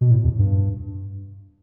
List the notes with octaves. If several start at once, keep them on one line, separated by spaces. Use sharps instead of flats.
B2
A2
E2
G2